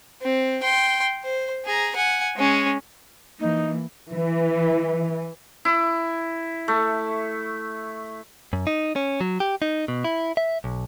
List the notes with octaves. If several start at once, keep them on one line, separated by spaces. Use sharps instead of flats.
C4
G5 C6
C5
G#4 A#5
F#5 G#5
G#3 C#4
E3 A#3 D#4
E3
E4
A3
F#2
D#4
C#4
F#3
G4
D#4
B2
E4
E5
B1